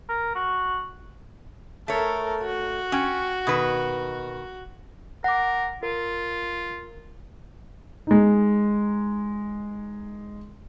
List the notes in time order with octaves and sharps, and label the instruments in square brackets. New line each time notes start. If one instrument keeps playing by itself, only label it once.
[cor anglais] A#4
F#4
[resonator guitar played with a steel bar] A3 C#5 [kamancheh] A4 A#4
[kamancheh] F#4
[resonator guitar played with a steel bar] C#4 G5
B2 D#3 B4
[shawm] A#4 [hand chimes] F#5 D6
[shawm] F4 [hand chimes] A#4
[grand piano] G#3 D#4